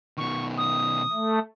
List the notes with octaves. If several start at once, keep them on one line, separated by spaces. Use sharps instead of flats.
B2 D#3 C#6
D#6
A3